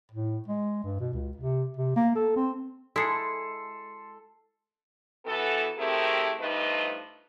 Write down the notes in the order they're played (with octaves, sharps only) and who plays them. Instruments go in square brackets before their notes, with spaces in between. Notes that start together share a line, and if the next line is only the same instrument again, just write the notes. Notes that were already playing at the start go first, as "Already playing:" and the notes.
[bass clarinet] A2
G#3
G2
B2
C#2
C3
C3
A#3
A4
C4
[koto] G#3 E4 [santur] A4 [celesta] C6 C7 C#7
[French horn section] E3 B3 F#4 A4
A3 C4 E4 G4 G#4 A#4
G2 F3 A3 D#4 B4 D#5